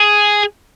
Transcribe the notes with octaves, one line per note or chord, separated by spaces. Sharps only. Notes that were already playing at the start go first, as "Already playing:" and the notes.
Already playing: G#4